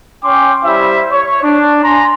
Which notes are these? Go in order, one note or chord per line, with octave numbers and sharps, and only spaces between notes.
C#4 G5 C6 D6
G3 E4 C5 E5
C#5
D4
G#5 A#5 C6